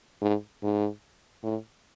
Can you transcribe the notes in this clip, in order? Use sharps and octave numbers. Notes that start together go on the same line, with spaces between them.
G#2
G#2
A2